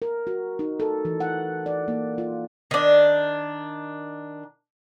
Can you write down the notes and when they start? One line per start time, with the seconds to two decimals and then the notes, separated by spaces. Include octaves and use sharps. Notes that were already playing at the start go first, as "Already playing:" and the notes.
0.02 A#4
0.27 F#4
0.59 D#4
0.80 A4
1.05 E3
1.20 F#5
1.66 D5
1.88 A#3
2.18 F4
2.71 D#3 D4